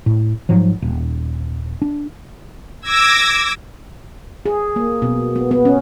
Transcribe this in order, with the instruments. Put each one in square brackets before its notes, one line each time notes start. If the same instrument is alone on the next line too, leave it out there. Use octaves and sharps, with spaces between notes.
[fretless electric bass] A2
G#2 F3 F#3
D#1
D4
[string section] D6 E6 G#6 A#6
[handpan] G#4
A#3
B2
B3
B3
C#4